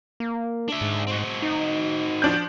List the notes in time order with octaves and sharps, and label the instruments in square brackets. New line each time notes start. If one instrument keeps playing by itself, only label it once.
[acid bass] A#3
[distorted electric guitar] D4 E5
[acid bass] G#2
[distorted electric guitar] C4 F#4
[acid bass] D#4
[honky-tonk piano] F3 D4 G6